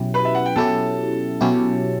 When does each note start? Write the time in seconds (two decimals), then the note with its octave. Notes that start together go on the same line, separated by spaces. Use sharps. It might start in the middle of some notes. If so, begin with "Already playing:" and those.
Already playing: B2 F#3 C#4 E4 G4
0.14 B4 B5
0.25 E5
0.35 F#5
0.46 G5
0.56 B2 F#3 C#4 E4 G4 A4 A5
1.41 B2 F#3 C#4 E4 G4